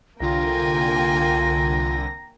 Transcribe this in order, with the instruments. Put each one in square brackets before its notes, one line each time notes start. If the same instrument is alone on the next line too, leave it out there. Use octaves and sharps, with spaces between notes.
[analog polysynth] C2 D3 A#6 [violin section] A#3 G5 G#5 [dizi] F4 [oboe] A#5